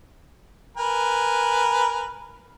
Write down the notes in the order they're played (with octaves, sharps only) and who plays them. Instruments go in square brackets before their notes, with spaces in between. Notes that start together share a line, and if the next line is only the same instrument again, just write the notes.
[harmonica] A#4 B4 G#5